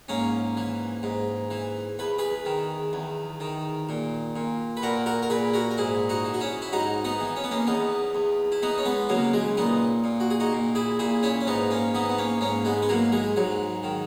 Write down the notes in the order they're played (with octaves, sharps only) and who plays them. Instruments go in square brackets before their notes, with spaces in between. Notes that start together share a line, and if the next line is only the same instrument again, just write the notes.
[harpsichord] G#2 A#3 C#4
E3
G#2
E3
E2 B4
G#4 B4
D#3
E2
D#3
A#2
A#2
B4
A#2 F#4 A#4
F#4 A#4
A#4
A#2 G#4 B4
F#4 A#4
A#4
G#2 E4 G#4
D#4 F#4
E3
F#4
C#4 E4
E4
G#2 D#4 F#4
B3 D#4
E3
C#4
B3
A#3 C#4
E2 B3 D#4
E2
E4
E3 B3 D#4
C#4
G#3 B3
C#3 F#3 A#3
E3 G#3
A#2 B3 D#4
A#2
F#4
G#4
D#4 F#4
A#2
E4 G#4
A#2 E4 G#4
C#4 E4
C#4
G#2 B3 D#4
A#3 C#4
E3 B3 D#4
B3
A#3 C#4
G#2 A#3 C#4
G#3 B3
B3
E3 F#3 A#3
E3 G#3
G#2 F#3
D#3